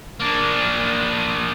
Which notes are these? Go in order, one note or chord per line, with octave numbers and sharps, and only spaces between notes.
A#3 D4